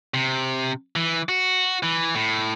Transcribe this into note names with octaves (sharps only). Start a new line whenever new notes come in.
C3
E3
F#4
E3
A2